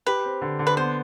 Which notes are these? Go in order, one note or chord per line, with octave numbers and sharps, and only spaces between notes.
G4 B4
C4
D3
D3
B4
B3 C5